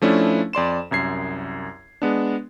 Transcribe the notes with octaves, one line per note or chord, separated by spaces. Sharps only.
F3 A3 C#4 D4 E4
F2 D5 C6 E7
C2 F#2 G#6 C7
G#3 B3 D4